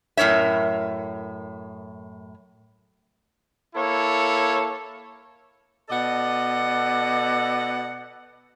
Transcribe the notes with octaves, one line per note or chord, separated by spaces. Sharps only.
F#2 A2 A#4 C#5 E5
A#3 E4 A4 C#5
B2 A4 D5 D#5 F#5